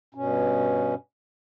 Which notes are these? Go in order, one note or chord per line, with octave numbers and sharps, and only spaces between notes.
G2 B2 C#4